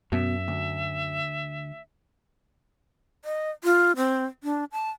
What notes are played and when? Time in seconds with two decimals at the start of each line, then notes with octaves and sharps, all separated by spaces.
0.12 F#2 B2 E5
0.48 D2
3.25 D#5
3.64 F4
3.96 C4
4.44 D4
4.72 A5